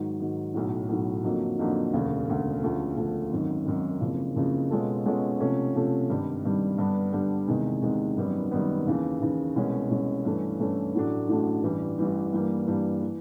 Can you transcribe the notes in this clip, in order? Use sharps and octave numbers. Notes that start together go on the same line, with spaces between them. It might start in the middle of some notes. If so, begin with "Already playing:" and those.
Already playing: G#2 D#3 F#3
G#2 D#3 F#3
B1 A2 F#3
B1 A2 F#3
F2 D3 F#3 A#3 D#4
F2 D3 F#3 A#3 D#4
E1 D2 C#3
E1 D2 C#3
D2 C#3 F3 A3
D2 C#3 F3 A3
G#1 F#2 D#3
G#1 F#2 D#3
F#1 F2 C#3
F#1 F2 C#3
B2 G#3 C#4 F4 A4
B2 G#3 C#4 F4 A4
C3 F3 A3 C#4
C3 F3 A3 C#4
G#1 G2 D#3 G3
G#1 G2 D#3 G3
G2 D3 G3 B3 D4
G2 D3 G3 B3 D4
E2 C3 D#3 G#3
E2 C3 D#3 G#3
G#1 F#2 D#3 G3 B3
G#1 F#2 D#3 G3 B3
D#2 C#3 E3
D#2 C#3 E3
C2 B2 G#3 C#4
C2 B2 G#3 C#4
G2 E3 A3 C#4 E4
G2 E3 A3 C#4 E4
A1 A2 F#3 A3 D4
A1 A2 F#3 A3 D4
A1 G2 E3 G3
A1 G2 E3 G3
G2 E3 G3 A#3
G2 E3 G3 A#3
E3